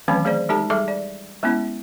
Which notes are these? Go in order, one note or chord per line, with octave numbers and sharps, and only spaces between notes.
D#3 E3 F#3 A3 C4 C#4
A3 G#4 C5 D5
G#3 D#4 G4 A4 A5
G3 G#4 A4 E5
D5
G#3 B3 C#4 E4